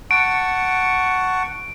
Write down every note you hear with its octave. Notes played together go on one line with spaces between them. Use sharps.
F#5 A5 C#6 D7